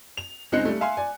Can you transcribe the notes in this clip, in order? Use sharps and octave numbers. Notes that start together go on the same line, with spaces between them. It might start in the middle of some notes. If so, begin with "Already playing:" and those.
F7
C#2 G#3 C4 D#4 F#6 C#7
G3 A3
E5 F5 G#5 C6
D5 G#5